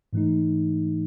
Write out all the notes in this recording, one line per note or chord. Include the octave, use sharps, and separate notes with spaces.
G#2 E3 A3 D#4